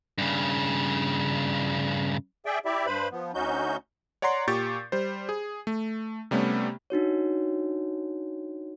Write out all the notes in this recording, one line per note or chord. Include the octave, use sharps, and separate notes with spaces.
G2 C#3
G#4 D5 E5 G5
E4 G4 D5 E5
G2 B4 C5 B5
F3 B3
D2 C#4 D#4 F#4 G6
C#5 D5 F#5 A#5 C6 C7
A#2 G4 C#6 G6 A6
G3 C5
G#4
A3
C3 G3 A3 B3 C#4
D4 D#4 F#4 C#5